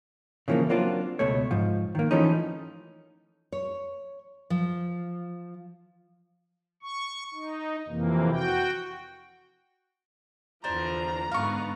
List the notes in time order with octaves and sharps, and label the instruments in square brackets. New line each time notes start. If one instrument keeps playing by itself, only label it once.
[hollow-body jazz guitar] C#3 E3 F3 G#3 A#3
F#3 A#3 C4 D4 F4
C#2 B2 A3 C#5
G#2 F3
D#3 A#3
E3 F3 A3 C#4 D#4
[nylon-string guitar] C#5
F3
[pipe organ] C#6
D#4
F2 C3 E3 A#3
F#4 G5
[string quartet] E2 D3 F3 [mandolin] D4 C5 [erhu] A#5
[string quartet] G#2 D3 B3 [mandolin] F5 C#6